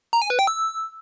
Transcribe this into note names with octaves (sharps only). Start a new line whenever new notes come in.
A#5
G#5
B4
G5
E6